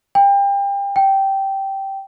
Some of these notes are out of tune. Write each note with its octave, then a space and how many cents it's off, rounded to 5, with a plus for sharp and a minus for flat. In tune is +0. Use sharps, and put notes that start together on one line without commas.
G5 +30
G5 -10